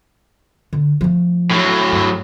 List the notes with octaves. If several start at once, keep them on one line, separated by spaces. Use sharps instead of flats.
D3
F3 A3
A2 F#3
G2